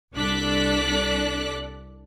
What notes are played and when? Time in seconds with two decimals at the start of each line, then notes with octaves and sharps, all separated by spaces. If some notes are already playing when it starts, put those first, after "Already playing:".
0.15 C2 D4 A4 D6 F#6 B6